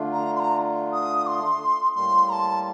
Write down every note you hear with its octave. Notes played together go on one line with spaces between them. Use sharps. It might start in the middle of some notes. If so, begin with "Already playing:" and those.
Already playing: D3 A3 D4 F4
A#5
C6
A#5
D#6
C6
A2 G3 A#3 C6
A#5
A5